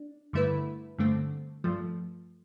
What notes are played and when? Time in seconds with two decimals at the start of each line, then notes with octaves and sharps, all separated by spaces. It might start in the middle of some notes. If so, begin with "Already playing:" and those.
Already playing: D4
0.33 G2 D3 A3 E4 B4
0.98 G2 D3 A3 C4
1.64 G2 F3 A3